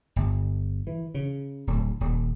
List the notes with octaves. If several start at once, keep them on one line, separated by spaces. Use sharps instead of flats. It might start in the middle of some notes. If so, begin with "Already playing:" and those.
G1
E3
C#3
D1
D#1